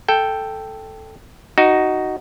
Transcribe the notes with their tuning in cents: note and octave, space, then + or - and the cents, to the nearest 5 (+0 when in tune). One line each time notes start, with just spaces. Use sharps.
A4 +0 G5 +0
D#4 +0 F#4 +10